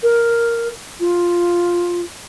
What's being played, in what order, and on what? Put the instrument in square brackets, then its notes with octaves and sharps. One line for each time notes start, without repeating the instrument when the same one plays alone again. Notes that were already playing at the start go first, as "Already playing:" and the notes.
[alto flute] A#4
F4